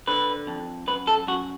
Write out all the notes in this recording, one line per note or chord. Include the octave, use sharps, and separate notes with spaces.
D3 B4
F2
F#2 B4
A4
F#2 F#4